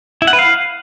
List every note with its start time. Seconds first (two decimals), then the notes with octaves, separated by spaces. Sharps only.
0.22 E4
0.27 F#5
0.33 B4
0.39 F5